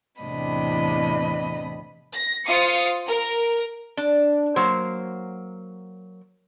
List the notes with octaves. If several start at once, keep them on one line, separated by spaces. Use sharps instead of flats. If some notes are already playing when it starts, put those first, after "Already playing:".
E2 A2 C3 D4 D#5 B5
A#6
F4 C5 F5 D#6 C7 C#7
A#4
D4
F#3 A#3 C5